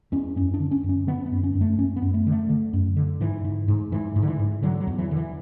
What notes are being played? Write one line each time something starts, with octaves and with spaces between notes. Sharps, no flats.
E2 C#4
F#2 C#4
D4
D3
C#4
F#2
C#4
D3 B3
B3
F#2
C#4
F#2
A3
F#2 C#4
B3
F#2
A3
D3 A3
D3
F#2
D3
G#2 E3
G#2
G#2
G#2 E3
G#2
D3
E3
G#2
D3 F#3
F#3
E2
E3
D3
E3